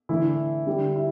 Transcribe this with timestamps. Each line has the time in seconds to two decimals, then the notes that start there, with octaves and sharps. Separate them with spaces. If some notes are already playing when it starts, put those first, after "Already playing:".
0.09 D3 E3 A3 E4
0.67 D3 G3
0.96 E4